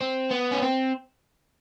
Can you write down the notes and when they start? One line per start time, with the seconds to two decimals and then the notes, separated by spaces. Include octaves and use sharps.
0.01 C4
0.31 B3
0.52 C#4
0.62 C4